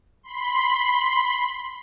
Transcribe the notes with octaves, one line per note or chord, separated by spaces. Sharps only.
B5 C6